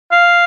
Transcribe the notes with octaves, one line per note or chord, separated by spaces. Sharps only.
F5